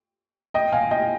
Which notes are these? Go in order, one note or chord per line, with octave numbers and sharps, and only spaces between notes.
D#5 G5
F5 G#5
D#5 G5